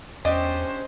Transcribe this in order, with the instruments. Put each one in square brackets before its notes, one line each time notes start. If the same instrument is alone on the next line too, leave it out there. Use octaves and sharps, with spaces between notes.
[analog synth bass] E2 [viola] C#4 C5 [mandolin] D4 G4 [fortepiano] D#5